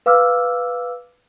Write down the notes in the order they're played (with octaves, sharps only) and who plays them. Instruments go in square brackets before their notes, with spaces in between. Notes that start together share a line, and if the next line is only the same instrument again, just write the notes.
[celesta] B4 F5 D6 E6 F6